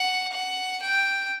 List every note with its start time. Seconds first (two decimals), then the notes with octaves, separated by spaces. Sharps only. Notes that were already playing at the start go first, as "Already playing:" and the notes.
Already playing: F#5
0.32 F#5
0.83 G5